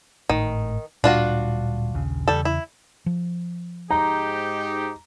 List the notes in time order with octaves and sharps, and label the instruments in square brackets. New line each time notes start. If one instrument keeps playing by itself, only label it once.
[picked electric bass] G#1 A2 [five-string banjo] D#3
[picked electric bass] D1 A#2 G3 [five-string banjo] D4 F4 F#4
[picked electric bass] A#1 D#2 C#3
[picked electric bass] E2 C#3 [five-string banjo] G3 A4
[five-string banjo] E4
[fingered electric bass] F3
[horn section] G#2 D#4 G4 [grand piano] A#5